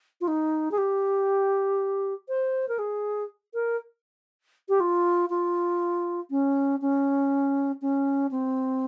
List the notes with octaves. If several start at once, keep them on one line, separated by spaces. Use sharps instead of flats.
F4
D#4
G#4
G4
C5
A#4
G#4
A#4
G4
F4
F4
C#4
C#4
C#4
C4